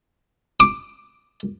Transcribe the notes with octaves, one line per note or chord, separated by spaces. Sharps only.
D6